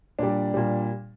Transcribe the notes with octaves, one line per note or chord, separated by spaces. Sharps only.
A#2 G3 D4
A#2 G3